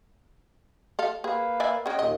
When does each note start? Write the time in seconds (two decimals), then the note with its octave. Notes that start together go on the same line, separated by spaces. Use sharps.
0.99 A4 F5
1.24 A#3 G#4 B4 F5
1.60 D5 E5 G#5
1.86 C#4 G#4 D#5 F#5 G5
1.99 D#2 A#2 D#5